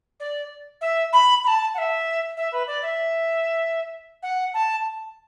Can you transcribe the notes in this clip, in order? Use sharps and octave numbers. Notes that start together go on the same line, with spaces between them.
D5
E5
B5
B5
A5
F#5
E5
E5
B4
D5
E5
F#5
A5